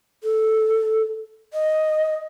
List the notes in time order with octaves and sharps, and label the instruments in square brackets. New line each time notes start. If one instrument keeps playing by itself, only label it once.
[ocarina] A4
D#5